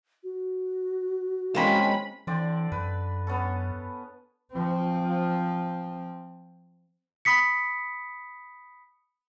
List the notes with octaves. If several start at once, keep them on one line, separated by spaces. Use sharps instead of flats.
F#4
G#3 A#3 C4 C#4 B5
D3 E3 C4 D5
F#2 B4
B3 C#4 A4
F3 C4
B5 D#6 B6 C#7